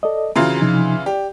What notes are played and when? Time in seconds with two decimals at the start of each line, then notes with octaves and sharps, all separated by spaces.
0.03 A4 D5 D#5
0.36 C#3 E3 F4 F#4 A#5
0.61 C3 F3 D#4
1.06 G4 D5